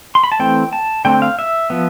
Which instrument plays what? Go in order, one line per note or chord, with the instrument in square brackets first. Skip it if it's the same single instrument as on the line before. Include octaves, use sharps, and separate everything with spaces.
[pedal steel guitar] C6
B5
A5
E3 A3 C4 G5
A5
D3 A3 C4 G5
F5
E5
F3 B3